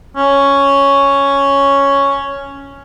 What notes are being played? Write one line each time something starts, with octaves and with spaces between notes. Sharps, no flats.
C#4